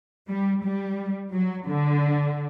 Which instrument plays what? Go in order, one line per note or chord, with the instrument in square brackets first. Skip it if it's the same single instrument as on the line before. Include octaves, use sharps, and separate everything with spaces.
[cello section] G3
G3
F#3
D3